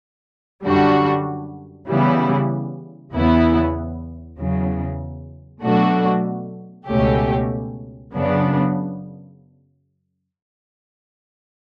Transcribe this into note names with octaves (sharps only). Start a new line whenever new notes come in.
F#2 D3 G3 D4 F#4
C#3 E3 G3 B3 E4
E2 C#3 E3 B3 E4
E2 C#3 F#3
B2 F#3 A3 D4 F#4
C#2 B2 A3 C#4 G4
F#2 C#3 F#3 B3 D4